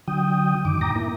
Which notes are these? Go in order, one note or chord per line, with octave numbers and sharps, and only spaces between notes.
D3 F#3 G5 D#6
F#2 D#3 D6
A2 G5 A#5 D6 D#6 A#6
A#3 E4